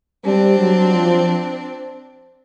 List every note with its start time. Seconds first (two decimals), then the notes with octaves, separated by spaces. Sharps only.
0.25 G3 C4 D4
0.59 F#3
0.92 F3